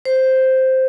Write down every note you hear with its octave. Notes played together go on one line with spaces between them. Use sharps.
C5